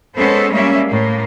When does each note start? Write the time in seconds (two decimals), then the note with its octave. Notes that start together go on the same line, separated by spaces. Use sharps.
0.16 G#3 B3 C#4 A4 C5
0.53 G3 G#3 A#3 C#4 E5
0.89 A2 A#3